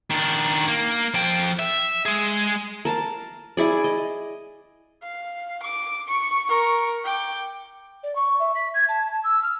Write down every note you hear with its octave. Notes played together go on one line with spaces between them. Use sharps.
D#3 D4
A#3
F3 G5
E5
G#3 G#4
A#4 A5
E4 G#4 D5
D#5
F5
D6
C#6
A#4 C#6
G5 D6
D5
C#6
E5
B6
G#6
A5
A5
E6
F6